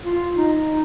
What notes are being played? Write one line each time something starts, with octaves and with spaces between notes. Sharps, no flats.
F4
D#4